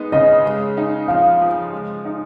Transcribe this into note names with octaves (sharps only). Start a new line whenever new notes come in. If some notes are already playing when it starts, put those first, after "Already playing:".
Already playing: G#3 B3 D#4
C#3 D#5
G#3
D#4
F3 F5
F3
G#3
D#4